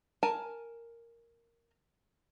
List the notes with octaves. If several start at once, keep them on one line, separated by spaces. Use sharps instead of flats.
A#4 G#5 A5